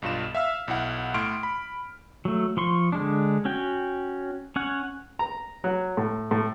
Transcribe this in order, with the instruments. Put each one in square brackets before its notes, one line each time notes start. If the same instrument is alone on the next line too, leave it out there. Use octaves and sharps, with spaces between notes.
[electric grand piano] B1 G2 F4 E7
E5 F5 E6 F6
B1 E4 F#5
A2 A3 C6 F6 D7
B5
[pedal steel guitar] F#3 A3
F3 C6 C#6
D3 G#3 D4
C#4 F#4 G5
C#4 C#5 F#5
[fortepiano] A#5
F#3
A2
A2